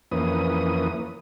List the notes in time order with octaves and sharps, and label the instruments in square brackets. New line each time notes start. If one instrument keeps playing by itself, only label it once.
[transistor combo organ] F2 E3 A#3 C#4 B4 D#6